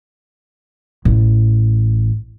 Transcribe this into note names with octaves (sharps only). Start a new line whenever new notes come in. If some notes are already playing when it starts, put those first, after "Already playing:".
A1